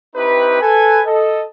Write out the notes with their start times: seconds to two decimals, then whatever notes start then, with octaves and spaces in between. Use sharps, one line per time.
0.16 C4 D#4 E4 G4 B4
0.61 A4 B4 G#5
1.06 A4 D#5